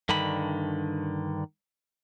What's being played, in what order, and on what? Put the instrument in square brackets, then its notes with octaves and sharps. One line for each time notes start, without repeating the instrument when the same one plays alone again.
[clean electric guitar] G2 D3 D#3 B5